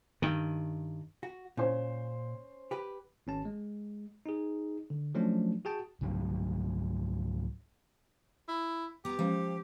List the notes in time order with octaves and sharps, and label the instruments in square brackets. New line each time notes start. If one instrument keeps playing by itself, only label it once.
[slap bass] G2 D#3
[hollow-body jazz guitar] F#4
[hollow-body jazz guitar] A#2 [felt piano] C#4 C5
[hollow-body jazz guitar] G4 B4
[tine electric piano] G#1 C#4 A5
G#3
D#4 G#4
D3
F3 F#3 A3 C#4 D4
F#4 G#4 G5 A5
[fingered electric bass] C#2 G#2 F#3 D4
[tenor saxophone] E4
[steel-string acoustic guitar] B3 A#5 [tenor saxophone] G4
[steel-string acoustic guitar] F3 [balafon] G#3 C#4